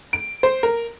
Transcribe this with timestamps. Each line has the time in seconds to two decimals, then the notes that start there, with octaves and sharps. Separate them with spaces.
0.13 D7
0.43 C5
0.63 A#4